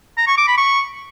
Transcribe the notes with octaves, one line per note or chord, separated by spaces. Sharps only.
A#5
C#6
D6
B5
C#6